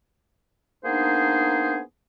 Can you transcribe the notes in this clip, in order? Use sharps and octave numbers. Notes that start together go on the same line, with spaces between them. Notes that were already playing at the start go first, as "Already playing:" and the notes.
A#3 B3 D4 D#4 G#4 C5